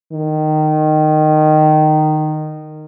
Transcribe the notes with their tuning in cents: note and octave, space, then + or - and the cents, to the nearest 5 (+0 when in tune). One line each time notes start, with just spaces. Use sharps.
D#3 -15